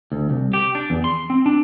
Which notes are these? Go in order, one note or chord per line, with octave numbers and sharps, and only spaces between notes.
D2
C2
G4
D4
E2
C6
C4
D4